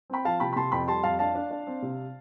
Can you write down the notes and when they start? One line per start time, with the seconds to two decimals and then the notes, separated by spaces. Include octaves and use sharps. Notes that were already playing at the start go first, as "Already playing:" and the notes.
0.10 C4 G5 B5
0.25 F3 F5 A5
0.40 C3 G5 B5
0.53 B5
0.56 C3 A5 C6
0.72 F2 G5 B5
0.88 G3 A5 C6
1.03 F2 F5 A5
1.19 D4 F5 A5
1.35 D4
1.51 D4
1.67 C4
1.82 C3